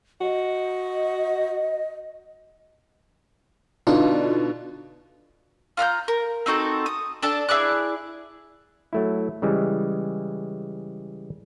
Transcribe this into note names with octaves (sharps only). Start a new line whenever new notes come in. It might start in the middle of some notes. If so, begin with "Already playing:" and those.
F#4 D#5
B2 D3 D4 D#4 F4
F4 A#5 F6 G6
A#4
C4 D#4 F#4 A4
D#6
D4 A4 A5
E4 G#4 D5 F#6
F#3 A3 E4
C#3 E3 G3 G#3